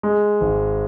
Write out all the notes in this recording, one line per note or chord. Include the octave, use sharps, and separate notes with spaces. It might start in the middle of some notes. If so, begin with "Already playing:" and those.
G#3
G#1